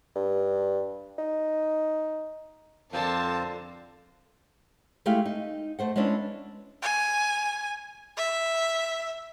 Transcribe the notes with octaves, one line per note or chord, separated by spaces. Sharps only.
G2
D#4
F2 D3 A#3 C4 F4 C5 A5
G#3 A3 E4 G4 F5
D#4
A3 C5 F#5
G#3 B3 C#4 D4 E4
G#5
E5